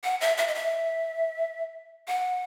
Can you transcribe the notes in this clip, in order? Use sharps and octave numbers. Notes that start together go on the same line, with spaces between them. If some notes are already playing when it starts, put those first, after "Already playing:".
F#5
E5
E5
D#5
E5
F#5